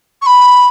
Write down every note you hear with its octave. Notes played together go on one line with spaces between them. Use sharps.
C#6
B5